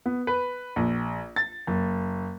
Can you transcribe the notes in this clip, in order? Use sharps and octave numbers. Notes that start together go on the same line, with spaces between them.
B3
B4
A#1
A6
F#1